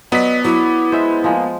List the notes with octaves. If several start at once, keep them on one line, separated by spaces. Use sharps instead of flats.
F#3 B3 D5 D#5 B6
F#3 E4 D6
G#3 C5 E5
F3 G#3 A#3